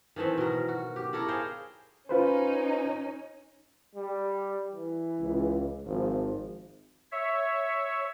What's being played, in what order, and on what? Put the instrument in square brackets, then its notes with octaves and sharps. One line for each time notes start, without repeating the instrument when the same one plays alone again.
[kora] D#3 E3 A3 C4
B2 A#4
F#4
G4
E4 A4 A#4 C#5
G#4 C5 F5 G5
[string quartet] C#4 D#4 [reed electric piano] F4 B4 C5
[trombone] G3
E3
[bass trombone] C#2
[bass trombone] G#1 [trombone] F3
[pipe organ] C#5 E5